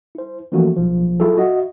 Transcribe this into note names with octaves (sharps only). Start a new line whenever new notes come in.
E4 C5
E3 F3 A3 A#3 C#4 F#4
B1 F3
F#3 E4 F4 G#4 A4
F#4 D#5 E5 F#5